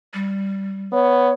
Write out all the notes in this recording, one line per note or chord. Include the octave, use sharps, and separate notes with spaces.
G3
B3 C#5